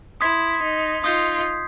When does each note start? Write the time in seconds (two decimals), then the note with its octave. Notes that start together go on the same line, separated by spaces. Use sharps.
0.21 E4 C6 D#6 G#6 B6
0.62 D#4
1.03 D#4 F4 C6 D#6 G6 C7